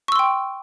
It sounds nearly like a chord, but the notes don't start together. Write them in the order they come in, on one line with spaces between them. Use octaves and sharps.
C#6 E6 C6 G5